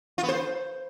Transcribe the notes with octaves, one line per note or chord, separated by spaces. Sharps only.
F4
B3
C5